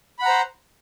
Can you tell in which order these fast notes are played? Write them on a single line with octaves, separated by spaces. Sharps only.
B5 F#5 A#5 C5